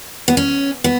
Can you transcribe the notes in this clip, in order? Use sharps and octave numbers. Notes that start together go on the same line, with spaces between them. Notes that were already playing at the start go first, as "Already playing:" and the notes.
B3
C#4
B3